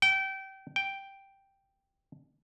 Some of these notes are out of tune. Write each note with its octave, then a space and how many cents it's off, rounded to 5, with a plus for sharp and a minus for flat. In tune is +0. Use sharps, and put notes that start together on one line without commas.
G5 -25
G5 +0